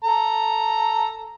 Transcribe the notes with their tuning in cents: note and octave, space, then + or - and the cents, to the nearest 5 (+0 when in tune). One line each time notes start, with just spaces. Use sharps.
A4 +0 A#5 -5